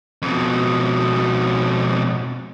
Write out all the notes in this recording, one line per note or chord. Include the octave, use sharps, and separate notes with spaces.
F2 B2